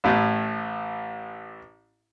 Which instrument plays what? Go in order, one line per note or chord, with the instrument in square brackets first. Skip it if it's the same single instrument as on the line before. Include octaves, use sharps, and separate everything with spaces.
[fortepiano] A1 A2